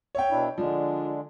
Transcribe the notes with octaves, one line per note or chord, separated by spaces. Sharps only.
C#5 E5 G5
B2 D4 E4
D3 F3 G#3 D4